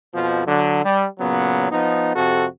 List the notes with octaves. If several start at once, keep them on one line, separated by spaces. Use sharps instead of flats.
F2 B2 F3
D3 F#3
G3
A#2 C#3 F#3 B3
F3 B3 D#4
F2 C3 F#4 A4